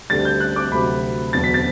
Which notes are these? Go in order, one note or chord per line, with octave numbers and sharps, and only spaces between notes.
D2 D3 G3 A6
G6
F#6
D6
D2 C3 F#3 B5
E1 E2 D3 F#3 A6
B6
A6